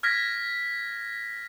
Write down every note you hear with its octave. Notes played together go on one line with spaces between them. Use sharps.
F6 G#6 A#6 B6